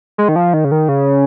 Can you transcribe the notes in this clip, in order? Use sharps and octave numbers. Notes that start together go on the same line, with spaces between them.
G#3
D#3
F3
D#3
C#3
D#3
C#3